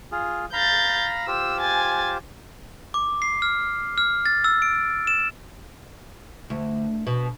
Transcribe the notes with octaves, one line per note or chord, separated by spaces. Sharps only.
F4 G#4
F5 A#5 B5 G6 A6
F4 G4 C5 E6
G#5 A6
D6
C7
F6
F6
A6
E6
D7
E7
D2
B2